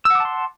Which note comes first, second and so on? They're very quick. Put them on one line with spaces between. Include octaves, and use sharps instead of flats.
E6 F#5 D6 A5 C6